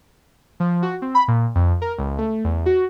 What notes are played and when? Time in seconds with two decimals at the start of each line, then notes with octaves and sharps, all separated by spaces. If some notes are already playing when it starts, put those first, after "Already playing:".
0.60 F3
0.82 F#4
1.02 C4
1.15 B5
1.28 A#2
1.55 F2
1.82 A#4
1.98 C#2
2.18 A3
2.44 E2
2.66 F#4